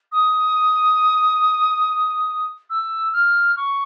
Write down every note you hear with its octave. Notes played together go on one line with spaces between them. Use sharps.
D#6
E6
F6
C#6